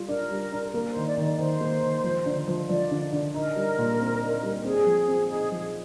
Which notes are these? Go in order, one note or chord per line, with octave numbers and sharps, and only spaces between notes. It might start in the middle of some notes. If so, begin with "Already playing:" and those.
Already playing: G3 F4
D4 A#4
G3
D4
A#3 A#4
C5
D#3
D5
D#3
D5
D#3 C5
A#3
D#3
F3
D3
F3
F3 D5
D3
D3
D#4 A#4
G3
A#2
C4
D#4
G3
C4 G#4
F3
C4
D#4 G#4
F3 G#4